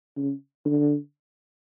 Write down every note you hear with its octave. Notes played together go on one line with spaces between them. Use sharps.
C#3
D3